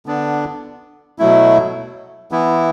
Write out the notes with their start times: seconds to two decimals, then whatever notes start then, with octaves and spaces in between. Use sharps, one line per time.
0.06 D3 B3 D4
1.19 B2 F#3 A3 E4
2.31 E3 B3 E4